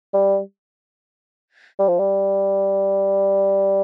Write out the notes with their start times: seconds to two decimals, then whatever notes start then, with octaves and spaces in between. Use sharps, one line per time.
0.14 G3
1.79 G3
1.88 F3
1.99 G3